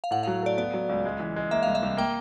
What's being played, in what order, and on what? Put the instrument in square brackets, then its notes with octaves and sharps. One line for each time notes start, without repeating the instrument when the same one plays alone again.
[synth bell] F5
[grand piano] A2 [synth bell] F#5
[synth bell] F5
[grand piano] F#3
[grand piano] A3 [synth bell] D5
[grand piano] B3 [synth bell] D5
[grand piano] F#3
C#2
G#3
E3
G#3
[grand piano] A#3 [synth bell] E5
[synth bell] F5
[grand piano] C2
[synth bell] E5
[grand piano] C2
[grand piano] A#3 [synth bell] G5